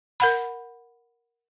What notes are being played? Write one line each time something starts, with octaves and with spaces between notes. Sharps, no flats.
A#4 F#5 B5